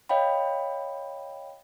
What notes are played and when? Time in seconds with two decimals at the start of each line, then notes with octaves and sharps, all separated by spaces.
0.09 C#5 D#5 F5 G5 B5